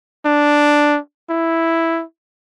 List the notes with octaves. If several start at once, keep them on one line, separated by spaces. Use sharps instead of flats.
D4
E4